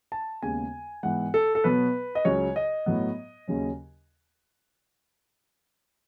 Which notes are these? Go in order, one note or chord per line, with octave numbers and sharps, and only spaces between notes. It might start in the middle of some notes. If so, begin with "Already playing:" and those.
A5
D#2 C#3 G#3 B3 G#5
G#2 E3 B3 F#5
A4
A4
B2 F#3 B3 B4
D#5
C#2 C#3 F#3 C#5
D#5
A2 F#3 B3
D#2 C#3 F#3 C#4